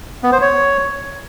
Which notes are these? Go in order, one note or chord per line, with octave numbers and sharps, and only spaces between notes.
B3
C5
C#5